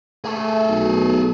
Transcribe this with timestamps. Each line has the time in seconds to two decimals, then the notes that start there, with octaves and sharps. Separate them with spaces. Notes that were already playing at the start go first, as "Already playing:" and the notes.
0.24 A3 G#4 A4
0.68 B1